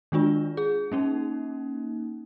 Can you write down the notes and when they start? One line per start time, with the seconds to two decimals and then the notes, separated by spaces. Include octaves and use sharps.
0.12 D#3 G#3 D4 F4
0.57 G#4
0.92 A#3 C#4 D#4